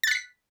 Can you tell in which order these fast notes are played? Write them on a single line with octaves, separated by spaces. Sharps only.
A6 F#6 B6